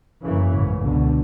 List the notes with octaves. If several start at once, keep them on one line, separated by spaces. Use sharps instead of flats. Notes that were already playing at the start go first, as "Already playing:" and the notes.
F#1 F#2 C#3 E3
A1 G#2 C#3
C#2 B2 D3